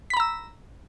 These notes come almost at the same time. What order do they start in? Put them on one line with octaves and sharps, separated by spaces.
B6 B5 A#5 E6